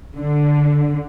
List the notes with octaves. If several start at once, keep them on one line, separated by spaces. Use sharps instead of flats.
D3